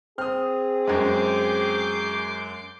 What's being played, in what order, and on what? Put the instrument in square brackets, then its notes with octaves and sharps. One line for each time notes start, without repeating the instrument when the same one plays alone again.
[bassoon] C4 [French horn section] G#4 [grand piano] D#6 F6
[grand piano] F#2 G#3 [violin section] D6 G6 C7